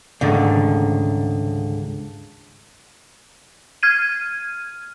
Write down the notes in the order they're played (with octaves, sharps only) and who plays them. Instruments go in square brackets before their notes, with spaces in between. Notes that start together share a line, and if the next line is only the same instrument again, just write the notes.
[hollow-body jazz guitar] C#2 G#2 D3 D#3 A3
[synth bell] F6 G#6 D#7